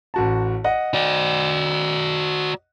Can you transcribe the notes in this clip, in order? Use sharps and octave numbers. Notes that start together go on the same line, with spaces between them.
A1 F#4 A5
D#5 F#5
F#4 D5